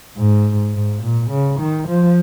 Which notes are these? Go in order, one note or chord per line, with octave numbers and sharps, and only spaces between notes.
G#2
G#2
A#2
C#3
D#3
F3